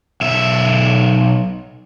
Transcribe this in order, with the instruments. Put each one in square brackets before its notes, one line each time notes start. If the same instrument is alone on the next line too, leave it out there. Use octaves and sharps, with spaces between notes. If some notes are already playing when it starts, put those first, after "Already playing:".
[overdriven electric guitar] B1 E5